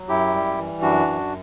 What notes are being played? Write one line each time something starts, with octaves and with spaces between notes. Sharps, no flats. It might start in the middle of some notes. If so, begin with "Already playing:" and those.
Already playing: F#3
F#2 E4 G4
G3
E3
F#2 D4 F#4
F#2